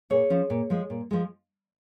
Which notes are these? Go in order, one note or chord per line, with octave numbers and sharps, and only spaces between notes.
A#2 G#4 C#5
F3 C#4
A#2
F3 G#3
A#2
F3 G#3